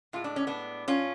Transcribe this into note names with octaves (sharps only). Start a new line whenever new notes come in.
A2 G#3 F4
D4
C#4
B3 D4
C#4 F4